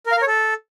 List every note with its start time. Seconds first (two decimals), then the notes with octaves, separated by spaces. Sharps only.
0.06 A#4
0.12 F5
0.17 A#4
0.22 C#5
0.27 A4